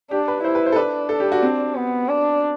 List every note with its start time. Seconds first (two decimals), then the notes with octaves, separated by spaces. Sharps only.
0.11 D4 G4
0.28 B4
0.43 E4 C5
0.55 B4
0.66 C5
0.72 A4
0.76 D4 B4
1.09 A4
1.20 G4
1.32 F#4
1.43 C4
1.75 B3
2.08 D4